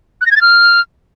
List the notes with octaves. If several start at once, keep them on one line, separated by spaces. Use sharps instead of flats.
F#6
A#6
G#6
A6
F6